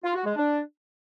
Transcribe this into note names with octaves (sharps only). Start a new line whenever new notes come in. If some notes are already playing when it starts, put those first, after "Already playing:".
F4
F#4
G#3
D4